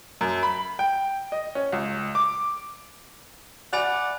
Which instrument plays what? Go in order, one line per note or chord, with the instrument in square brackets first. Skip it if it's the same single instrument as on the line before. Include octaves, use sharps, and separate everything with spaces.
[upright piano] F#2
B5
G5
D#5
C#4
C#2
D6
[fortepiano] D5 [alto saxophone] F#5 [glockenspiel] G#5 B5 F7